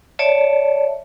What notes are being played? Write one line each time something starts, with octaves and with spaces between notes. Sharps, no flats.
C#5 D5 E5 A5